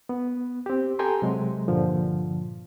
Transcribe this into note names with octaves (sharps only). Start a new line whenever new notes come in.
B3
C4 G4
G4 A4 G5 G#5 A#5 C6
C3 F#3 G#3
G2 A#2 D3 F3